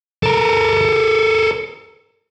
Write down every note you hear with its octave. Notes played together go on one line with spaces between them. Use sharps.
A4 A#4